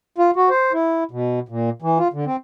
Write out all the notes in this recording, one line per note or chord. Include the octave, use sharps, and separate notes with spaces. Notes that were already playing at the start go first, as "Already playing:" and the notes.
F4
F#4
C5
E4
B2
A#2
E3
F4
D3
C4